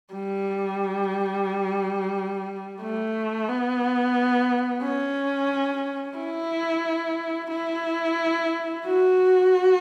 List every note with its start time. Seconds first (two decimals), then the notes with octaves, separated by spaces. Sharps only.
0.14 G3
2.81 A3
3.49 B3
4.82 C#4
6.18 E4
7.51 E4
8.86 F#4